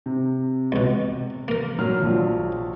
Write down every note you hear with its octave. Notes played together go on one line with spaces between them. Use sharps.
C3
C#2 B2
A#3 A#4
A#2 F#3 F6
A#1 F3 F#3